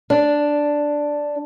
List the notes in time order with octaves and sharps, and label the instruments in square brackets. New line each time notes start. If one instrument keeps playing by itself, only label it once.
[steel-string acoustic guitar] D4